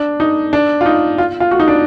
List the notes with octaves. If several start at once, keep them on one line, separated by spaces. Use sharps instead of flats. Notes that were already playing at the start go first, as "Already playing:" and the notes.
Already playing: D4
D#4
D4
F4
D#4
F4
F4
F#4
D#4
D4